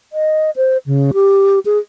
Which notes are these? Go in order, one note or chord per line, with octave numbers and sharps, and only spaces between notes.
D#5
C5
C#3
G4
G#4